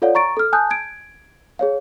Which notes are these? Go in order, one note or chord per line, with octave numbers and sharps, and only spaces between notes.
F4 A4 C#5 D5 F5 F#5
A#5 C#6 A6 D7
A4 F6
G#5 A5 D#6 F#6 G6
G#6 D7
G#4 C#5 F5